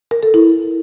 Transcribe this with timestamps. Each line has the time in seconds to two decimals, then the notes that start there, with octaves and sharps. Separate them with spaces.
0.11 A#4
0.23 A4
0.34 E4